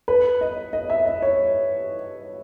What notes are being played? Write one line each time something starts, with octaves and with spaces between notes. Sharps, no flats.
B4
D#5
D#5
E5
D#5
C#5